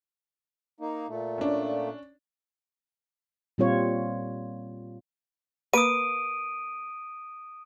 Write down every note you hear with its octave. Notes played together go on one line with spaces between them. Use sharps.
A#3 D#4
A#2 A3
C#4 D4
A#2 G3 C4 F4 C#5
A#3 B4 D#6 D7 D#7